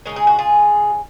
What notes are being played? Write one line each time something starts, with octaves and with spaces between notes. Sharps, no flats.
C#3 G#3 D#4 A#4
G#4
F#4
F4 G#4